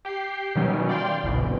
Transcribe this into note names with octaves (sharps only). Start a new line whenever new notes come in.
G4 G5 C7
B2 D#3 E3 F#3 G3 C#4
D5 F5 G5 C6
G1 C2 B2 E3